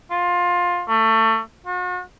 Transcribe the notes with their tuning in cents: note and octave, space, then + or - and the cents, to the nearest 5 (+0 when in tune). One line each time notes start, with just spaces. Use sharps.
F4 +20
A3 +25
F#4 -40